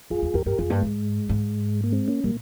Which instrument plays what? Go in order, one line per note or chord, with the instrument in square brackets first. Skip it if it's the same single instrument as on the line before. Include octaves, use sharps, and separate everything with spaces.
[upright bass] F2 [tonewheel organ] F4 G#4
[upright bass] E2
[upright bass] F2 [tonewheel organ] G4 A#4
[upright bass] G2 [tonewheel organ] G4 A#4
[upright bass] F2 [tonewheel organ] F4 G#4
[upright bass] G2 [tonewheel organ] G3 A#3
[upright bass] G#2 [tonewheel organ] G#3
[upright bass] G#2
[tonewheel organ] A#3
G#3 C4
A#3 C#4
[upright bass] A#2 [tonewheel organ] G3 A#3